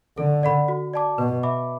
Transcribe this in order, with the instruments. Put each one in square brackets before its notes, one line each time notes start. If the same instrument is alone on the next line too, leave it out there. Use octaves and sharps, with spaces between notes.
[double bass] D3 [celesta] A4
[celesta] D5 F#5 B5
F#4
D5 A5 D6
[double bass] B2 [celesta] B4
[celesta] E5 B5 D6